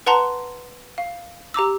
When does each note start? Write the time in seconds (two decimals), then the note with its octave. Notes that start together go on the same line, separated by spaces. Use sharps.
0.06 B4 F#5 A5 A#5 C6
0.98 F5
1.54 G4 A#5 D6 E6